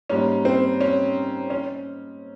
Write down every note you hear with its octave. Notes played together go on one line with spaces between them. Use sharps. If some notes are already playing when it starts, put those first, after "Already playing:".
G#2 G3 A#3 C#4
C4
C#4
C#4